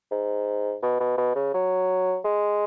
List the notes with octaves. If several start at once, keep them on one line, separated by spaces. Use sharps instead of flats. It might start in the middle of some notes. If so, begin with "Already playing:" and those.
G#2
B2
B2
B2
C#3
F#3
G#3